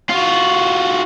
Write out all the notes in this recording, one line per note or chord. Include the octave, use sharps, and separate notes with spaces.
F4 F#4